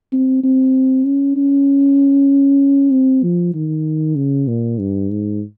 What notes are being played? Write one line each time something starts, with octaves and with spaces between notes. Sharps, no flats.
C4
C4
C#4
C#4
C4
F3
D#3
C#3
A#2
G2
G#2